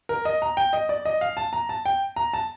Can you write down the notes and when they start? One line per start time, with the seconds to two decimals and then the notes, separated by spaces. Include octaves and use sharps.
0.09 A#4
0.25 D#5
0.42 A#5
0.57 G5
0.73 D#5
0.89 D5
1.05 D#5
1.21 F5
1.37 A5
1.53 A#5
1.69 A5
1.86 G5
2.16 A#5
2.33 A5